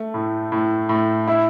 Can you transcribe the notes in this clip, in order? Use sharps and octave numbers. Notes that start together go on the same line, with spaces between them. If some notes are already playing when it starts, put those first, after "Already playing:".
Already playing: A3
A2
A2
A2
E4